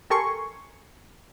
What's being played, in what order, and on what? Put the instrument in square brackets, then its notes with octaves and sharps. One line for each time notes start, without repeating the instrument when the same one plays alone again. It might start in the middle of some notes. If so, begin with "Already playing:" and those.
[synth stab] G4 A4 A#4 G#5 C6 C#6